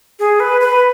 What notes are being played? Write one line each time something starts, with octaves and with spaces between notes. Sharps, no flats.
G#4
B4
B4